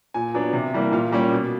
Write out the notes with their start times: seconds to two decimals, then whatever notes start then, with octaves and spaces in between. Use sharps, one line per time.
0.14 A#2 G#5
0.34 F#3 B3 D4
0.53 C3
0.73 E3 G3 A#3
0.92 A#2 F5
1.12 G3 A#3 C#4
1.32 B2